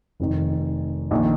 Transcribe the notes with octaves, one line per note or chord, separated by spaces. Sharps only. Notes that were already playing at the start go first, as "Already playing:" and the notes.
F1 F2 D#3
A#1 D#3